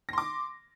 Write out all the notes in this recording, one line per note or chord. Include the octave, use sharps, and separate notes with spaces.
C6 D6 A#6